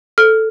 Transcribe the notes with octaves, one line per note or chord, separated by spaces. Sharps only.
A4 F6